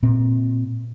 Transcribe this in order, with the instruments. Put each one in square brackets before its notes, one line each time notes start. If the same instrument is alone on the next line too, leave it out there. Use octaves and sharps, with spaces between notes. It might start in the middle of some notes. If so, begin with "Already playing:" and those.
[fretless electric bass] A#2 C4